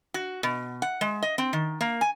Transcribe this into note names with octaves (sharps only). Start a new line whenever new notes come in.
F#4
B2
F#5
G#3
D#5
C4
D#3
A#3
G#5